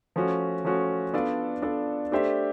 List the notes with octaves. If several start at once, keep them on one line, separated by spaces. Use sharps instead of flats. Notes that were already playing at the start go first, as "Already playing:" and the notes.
F3 A3 C#4 F#4
F3 A3 C#4 F#4
B3 D4 F4 A4 D5
B3 D4 F4 A4 D5
A3 D4 G4 C5 E5